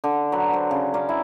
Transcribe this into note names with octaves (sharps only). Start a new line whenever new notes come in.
D3
F#3 B4
C5
C#3
C#4 A#4 D5
E4